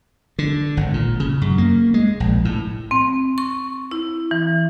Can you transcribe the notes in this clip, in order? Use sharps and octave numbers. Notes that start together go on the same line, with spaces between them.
D3
G#1
A#2
C#3
F#2
A#3
G#3
A#1
A2
C4
C#6
E4
E3